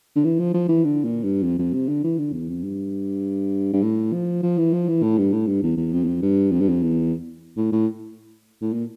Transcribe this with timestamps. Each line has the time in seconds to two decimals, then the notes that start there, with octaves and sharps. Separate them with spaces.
0.16 D3
0.24 E3
0.39 F3
0.54 F3
0.69 E3
0.84 D3
1.04 A#2
1.24 G2
1.43 F2
1.59 F2
1.74 C3
1.89 D3
2.04 E3
2.18 D3
2.33 E2
2.49 F2
2.64 G2
3.73 G2
3.83 A2
4.13 F3
4.43 F3
4.58 E3
4.73 F3
4.88 E3
5.02 A2
5.18 G2
5.33 A2
5.47 G2
5.63 E2
5.77 E2
5.92 F2
6.03 E2
6.07 F2
6.22 G2
6.52 F2
6.61 G2
6.69 F2
6.82 E2
7.57 A2
7.72 A2
8.61 A2
8.73 A#2